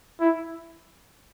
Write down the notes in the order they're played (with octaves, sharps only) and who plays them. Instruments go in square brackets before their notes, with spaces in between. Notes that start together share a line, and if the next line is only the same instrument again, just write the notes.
[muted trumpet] E4